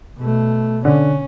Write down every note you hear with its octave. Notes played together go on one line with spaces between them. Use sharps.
B2 A3
D3 C#4